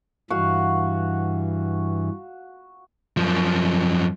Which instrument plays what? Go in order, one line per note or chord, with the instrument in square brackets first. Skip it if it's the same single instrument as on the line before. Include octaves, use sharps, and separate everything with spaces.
[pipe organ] G2 E3 [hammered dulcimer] F#4 F5 F#5
[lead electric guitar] F#2 F3